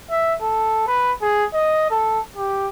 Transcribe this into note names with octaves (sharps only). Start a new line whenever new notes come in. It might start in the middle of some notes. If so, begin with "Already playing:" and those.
E5
A4
B4
G#4
D#5
A4
G4